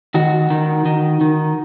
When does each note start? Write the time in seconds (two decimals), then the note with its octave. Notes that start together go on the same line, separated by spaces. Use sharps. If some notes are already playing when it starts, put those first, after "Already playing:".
0.14 D#3 F#4
0.50 D#3
0.86 D#3
1.21 D#3